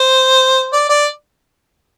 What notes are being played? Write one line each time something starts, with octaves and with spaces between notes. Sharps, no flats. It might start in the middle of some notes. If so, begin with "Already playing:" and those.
Already playing: C5
D5
D5